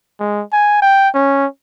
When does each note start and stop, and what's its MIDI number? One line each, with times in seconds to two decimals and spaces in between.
0.20 0.43 56
0.52 0.80 80
0.82 1.09 79
1.14 1.46 61